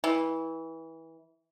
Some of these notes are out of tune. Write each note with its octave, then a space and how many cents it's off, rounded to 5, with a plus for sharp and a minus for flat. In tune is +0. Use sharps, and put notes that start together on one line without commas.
E3 -20